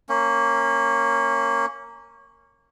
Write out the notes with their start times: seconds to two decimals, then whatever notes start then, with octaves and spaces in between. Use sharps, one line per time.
0.09 A#3 C#4